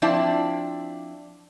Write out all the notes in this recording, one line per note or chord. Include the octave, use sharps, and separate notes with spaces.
F3 C4 D4 E4 D5 A5